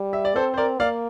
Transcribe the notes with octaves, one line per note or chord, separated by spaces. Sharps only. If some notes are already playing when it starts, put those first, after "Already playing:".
Already playing: G3
E5
D5
C4 A4 C5
C5
A#4 D5
A#3 D5 F5